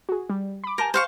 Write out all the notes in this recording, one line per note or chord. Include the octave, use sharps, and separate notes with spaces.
F#4 G#4
G3
B5 D6
A#4 G#5 A5 G6
C5 F5 C#6